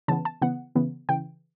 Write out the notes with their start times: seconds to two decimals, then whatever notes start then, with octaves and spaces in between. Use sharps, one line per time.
0.08 C#3 E3 B3 A5
0.25 A5
0.42 C#3 E3 B3 F#5
0.75 C#3 E3 B3
1.09 C#3 E3 G5